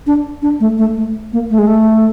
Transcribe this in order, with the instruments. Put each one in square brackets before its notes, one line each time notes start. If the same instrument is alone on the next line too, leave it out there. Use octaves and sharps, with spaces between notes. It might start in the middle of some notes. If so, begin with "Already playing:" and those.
[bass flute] D4
D4
A3
A3
A3
A#3
A3
G#3
A3